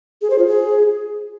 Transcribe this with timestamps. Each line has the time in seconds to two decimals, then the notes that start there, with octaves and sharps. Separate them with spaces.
0.22 G#4
0.30 C5
0.39 F4
0.47 G#4